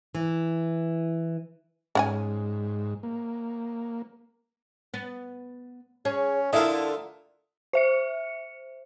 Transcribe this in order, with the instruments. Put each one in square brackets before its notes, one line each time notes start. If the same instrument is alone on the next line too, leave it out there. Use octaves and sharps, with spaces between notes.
[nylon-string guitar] E3
[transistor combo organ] G#2 [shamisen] C#4 F#5 G#5
[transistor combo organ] A#3
[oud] B3
[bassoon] C#4 [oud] G#4 C#5
[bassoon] D3 [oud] E4 F5 [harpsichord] F4 A4 A#4 [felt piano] E5 D#6
[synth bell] C5 E5 C#7